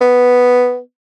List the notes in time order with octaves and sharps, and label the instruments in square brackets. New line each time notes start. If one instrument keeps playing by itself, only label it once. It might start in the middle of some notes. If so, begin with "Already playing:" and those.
[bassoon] B3